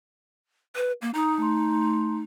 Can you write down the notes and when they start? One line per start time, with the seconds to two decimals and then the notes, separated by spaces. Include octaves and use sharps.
0.75 B4
1.01 A#3
1.14 D#4 A#5 D#6
1.38 A3 A#5 C6